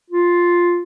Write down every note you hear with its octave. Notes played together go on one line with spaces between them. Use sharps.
F4